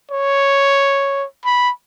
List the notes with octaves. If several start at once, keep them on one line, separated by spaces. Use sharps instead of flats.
C#5
B5